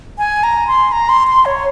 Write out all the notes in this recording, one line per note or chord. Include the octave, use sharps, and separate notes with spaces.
G#5
A#5
C6
A#5
C6
C6
C#5